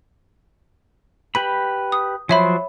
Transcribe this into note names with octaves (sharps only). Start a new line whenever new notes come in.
G4 B4 B5 F#7
D#6
F3 F#3 C5 C#5 E5 B5